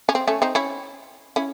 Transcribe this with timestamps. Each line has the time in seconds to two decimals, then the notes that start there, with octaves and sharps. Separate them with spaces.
0.09 C#4
0.15 C4
0.27 A3 C#4
0.42 C4 D#4
0.55 C#4 E4
1.36 C#4 E4